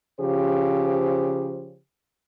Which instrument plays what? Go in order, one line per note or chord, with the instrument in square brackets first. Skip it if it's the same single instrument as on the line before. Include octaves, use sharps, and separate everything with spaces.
[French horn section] C#3 F3 C#4 G4 C5